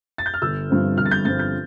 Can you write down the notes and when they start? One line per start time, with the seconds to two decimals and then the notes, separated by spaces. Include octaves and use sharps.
0.18 A6
0.26 G6
0.34 F6
0.42 G1 E6
0.69 G2 F3 C4
0.97 G1 F6
1.05 A6
1.11 G6
1.25 G2 F3 C4 A6
1.39 G6